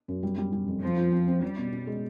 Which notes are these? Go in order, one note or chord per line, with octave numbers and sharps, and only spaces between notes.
F#2
G3
G3
G3
F2
F3 C4
F4
C4
C4
G3 C#4
B2
C#4
G#3